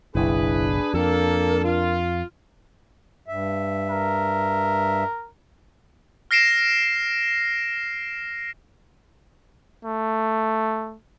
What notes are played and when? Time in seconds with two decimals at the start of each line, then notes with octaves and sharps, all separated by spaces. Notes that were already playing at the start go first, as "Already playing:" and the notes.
0.15 F#1 B1 D4 E4 G#4 B4
0.94 F2 A#3 A4 A#4
1.64 F4
3.28 G2 E5
3.90 A#4
6.31 F6 A#6 C7 D7 E7
9.85 A3